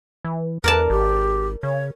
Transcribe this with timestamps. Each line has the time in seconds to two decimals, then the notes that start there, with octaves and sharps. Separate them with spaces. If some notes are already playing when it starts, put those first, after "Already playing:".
0.24 E3
0.64 E2 A#4 B4 D5 A5
0.90 G#1 G4
1.63 C#3 C#5